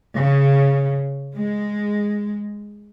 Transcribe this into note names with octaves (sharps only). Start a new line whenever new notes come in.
C#3
G#3